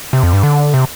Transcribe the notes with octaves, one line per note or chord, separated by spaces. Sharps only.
C3
F2
G2
D3
C3